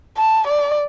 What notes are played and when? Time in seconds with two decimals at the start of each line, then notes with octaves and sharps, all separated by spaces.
0.18 A5
0.48 D5